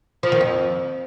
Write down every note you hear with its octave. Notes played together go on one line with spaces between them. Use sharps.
F3
D#3
F2